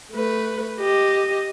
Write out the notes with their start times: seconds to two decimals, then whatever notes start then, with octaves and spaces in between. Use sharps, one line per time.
0.12 A3 B4
0.81 G4 D#5